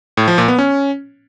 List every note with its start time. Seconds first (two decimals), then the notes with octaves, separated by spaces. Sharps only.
0.17 A2
0.28 F3
0.38 A#2
0.48 B3
0.59 C#4